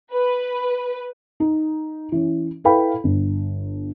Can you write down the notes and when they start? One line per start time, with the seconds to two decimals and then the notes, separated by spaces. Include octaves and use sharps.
0.12 B4
1.40 D#4
2.12 E3 C#4
2.64 E4 A4 B4 F5 G5 B5
3.04 G1